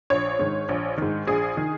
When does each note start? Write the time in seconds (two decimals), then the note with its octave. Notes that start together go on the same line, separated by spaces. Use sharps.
0.10 A#1 C#5
0.39 G#2 D#3
0.69 A#1
0.98 G#2 D#3
1.27 A#1 G#4
1.57 D#3